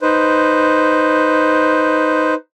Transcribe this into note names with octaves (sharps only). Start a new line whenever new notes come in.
D#4 B4 C5